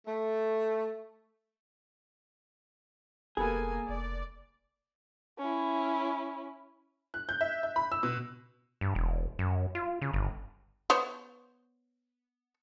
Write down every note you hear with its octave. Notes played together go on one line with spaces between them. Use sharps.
A3
F1 G3 A#3 B3 G#4 A4 G#5
F1 D5
C#4 E4
F#6
G6
E5
E5
B5
E6
B2
G2
E1
F#2
F4
C#3
G1
B3 C5 C#5